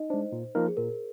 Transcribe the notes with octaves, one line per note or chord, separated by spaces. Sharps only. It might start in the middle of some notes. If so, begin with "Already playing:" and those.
Already playing: D#4 D#5
G#3 D4 C5
A#2
F3 A#3 D#4 A#4
G#4
A#2 A#4